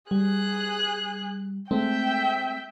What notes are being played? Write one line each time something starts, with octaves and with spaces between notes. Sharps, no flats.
G3 G#4 F#6
G#3 A3 C4 E5 G5